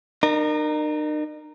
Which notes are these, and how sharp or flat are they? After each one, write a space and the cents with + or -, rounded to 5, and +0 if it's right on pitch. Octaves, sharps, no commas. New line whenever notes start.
D#4 -45 A#4 +0